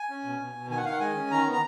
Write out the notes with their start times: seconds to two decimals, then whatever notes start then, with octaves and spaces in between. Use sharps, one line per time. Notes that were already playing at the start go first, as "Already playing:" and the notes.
Already playing: G#5
0.10 C#4
0.24 B2
0.40 B2
0.55 B2
0.70 D#3 G#5
0.77 F#5
0.85 D#3 F5
0.92 F#5
1.00 G#3 G#5
1.16 C#4
1.30 D#3 A#5
1.46 B3
1.52 A#5